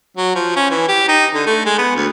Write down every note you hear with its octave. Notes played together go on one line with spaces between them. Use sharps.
F#3
F3
C#4
E3
G4
D#4
D3
A3
G#3
B3
D2